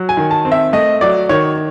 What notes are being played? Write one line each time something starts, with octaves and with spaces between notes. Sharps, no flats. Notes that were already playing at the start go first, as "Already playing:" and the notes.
Already playing: F#3
G#5
D#3
A5
C4
E5
A3 D#5
F#3 D5
D#3 C#5